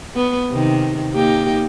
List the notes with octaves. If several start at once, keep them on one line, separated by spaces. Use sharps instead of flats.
B3
C3 D#3
A#3 D#4 G4